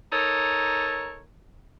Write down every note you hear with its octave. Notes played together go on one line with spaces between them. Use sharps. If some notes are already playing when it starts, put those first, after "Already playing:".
D#4 A4 A#4 C#5